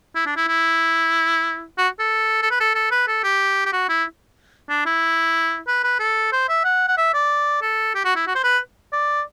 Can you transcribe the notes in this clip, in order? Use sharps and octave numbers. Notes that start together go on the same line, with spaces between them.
E4
D4
E4
E4
F#4
A4
A4
B4
A4
A4
B4
A4
G4
G4
F#4
E4
D4
E4
B4
B4
A4
C5
E5
F#5
F#5
E5
D5
A4
G4
F#4
E4
F#4
C5
B4
D5